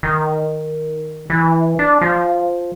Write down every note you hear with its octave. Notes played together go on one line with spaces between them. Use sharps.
D#3
E3
D4
F3